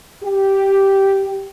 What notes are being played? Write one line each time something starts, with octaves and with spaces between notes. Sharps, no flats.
G4